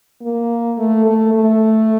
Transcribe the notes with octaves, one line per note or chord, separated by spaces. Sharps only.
A#3
A3
A3
A3